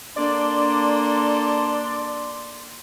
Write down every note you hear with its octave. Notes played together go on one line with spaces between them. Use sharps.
A#3 D4 A4 D5 C6